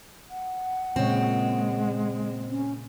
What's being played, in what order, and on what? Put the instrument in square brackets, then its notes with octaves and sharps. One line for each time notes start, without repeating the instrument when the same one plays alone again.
[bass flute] F#5
[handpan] A#2 C#3 C#5 [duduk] G#3 [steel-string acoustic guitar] C4
[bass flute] C#4